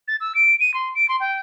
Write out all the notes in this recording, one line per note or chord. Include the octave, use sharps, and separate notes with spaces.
A6
E6
D7
D#7
C6
D7
C6
G5